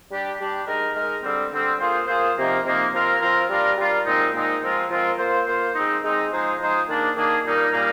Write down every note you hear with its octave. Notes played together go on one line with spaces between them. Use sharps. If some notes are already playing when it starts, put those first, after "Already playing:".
G3 D4 G4
G3 D4 G4
G#3 D#4 A#4
G#3 D#4 A#4
D3 G3 C4
D3 G3 C4
A#3 F4 G#4 C5
A#3 F4 G#4 C5
C3 F3 A#3 D#4
C3 F3 A#3 D#4
F3 C4 F4 A#4
F3 C4 F4 A#4
G3 D4 F4 A#4
G3 D4 F4 A#4
A#2 G#3 C4 D#4
A#2 G#3 C4 D#4
F3 G#3 C4 F4 A#4
F3 G#3 C4 F4 A#4
A#3 F4 C5
A#3 F4 C5
G#3 C4 D#4
G#3 C4 D#4
F3 G#3 D#4 G#4 C5
F3 G#3 D#4 G#4 C5
D#3 A#3 D4 G#4
D#3 A#3 D4 G#4
A#2 G3 A#3 D#4 A#4
A#2 G3 A#3 D#4 A#4